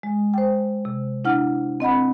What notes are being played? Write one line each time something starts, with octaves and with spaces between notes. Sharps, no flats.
G#3
C5 G5
C3
D4 E4 F#5 F6
C4 D#5 F#5 B5